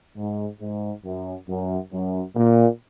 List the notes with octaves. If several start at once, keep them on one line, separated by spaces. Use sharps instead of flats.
G#2
G#2
F#2
F#2
F#2
A#2